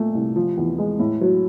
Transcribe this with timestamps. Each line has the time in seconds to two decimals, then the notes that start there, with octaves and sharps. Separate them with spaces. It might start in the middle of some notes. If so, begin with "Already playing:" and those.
Already playing: A#2 A3
0.14 C2
0.36 F3
0.57 E2
0.78 G#3
0.99 A2
1.21 F#3